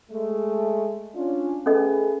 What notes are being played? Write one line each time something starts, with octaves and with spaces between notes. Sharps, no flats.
G#3 A3
C#4 D4 F4
A3 C#4 G#4 A4 B4 D#5